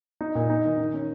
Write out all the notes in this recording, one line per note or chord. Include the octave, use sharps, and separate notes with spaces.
D#4
A#2
D#4
D#3
D#3
C#4